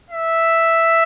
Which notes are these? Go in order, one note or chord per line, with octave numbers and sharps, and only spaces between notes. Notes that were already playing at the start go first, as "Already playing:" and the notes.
E5